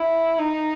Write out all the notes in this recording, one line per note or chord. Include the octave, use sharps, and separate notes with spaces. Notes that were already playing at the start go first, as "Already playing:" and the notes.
Already playing: E4
D#4